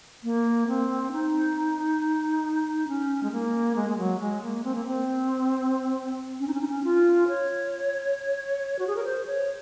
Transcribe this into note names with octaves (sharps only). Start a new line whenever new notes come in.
A#3
C4
D#4
C#4
G#3
A#3
G#3
G#3
F#3
G#3
A#3
C4
A#3
C4
C#4
D#4
C#4
D#4
C#4
F4
C#5
F#4
G#4
A#4
C5
C#5